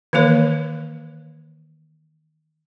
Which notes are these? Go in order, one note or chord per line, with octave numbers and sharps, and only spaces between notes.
D#3 E3 A#3 A#4 C#5